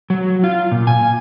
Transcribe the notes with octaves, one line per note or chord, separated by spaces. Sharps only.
F#3
F4
A#2
G#5